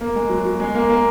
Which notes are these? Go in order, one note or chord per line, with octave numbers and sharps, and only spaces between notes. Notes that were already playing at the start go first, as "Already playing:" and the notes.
A#3
G#3
F#3
F#3
G#3
A#3
A#3